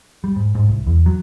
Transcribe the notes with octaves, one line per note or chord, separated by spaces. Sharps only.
G3
G#2
G#2
C2
E2
F#3